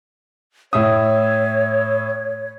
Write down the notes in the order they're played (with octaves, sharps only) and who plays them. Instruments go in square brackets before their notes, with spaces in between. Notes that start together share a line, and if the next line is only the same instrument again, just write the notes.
[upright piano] A2 E5 D#6 [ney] C#5